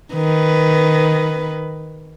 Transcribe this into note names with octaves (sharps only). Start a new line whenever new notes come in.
D#3 B4